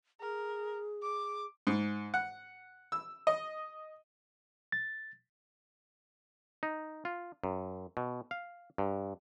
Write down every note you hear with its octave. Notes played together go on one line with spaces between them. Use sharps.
G#4 A#4
D6
G#2
F#5
E6
D#5
A6
D#4
F4
F#2
B2
F5
G2